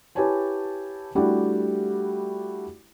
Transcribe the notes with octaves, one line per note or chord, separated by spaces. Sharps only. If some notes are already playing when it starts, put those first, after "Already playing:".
E4 G4 B4 C#5 G#5 A5
G3 A3 D4 E4 F#4 G4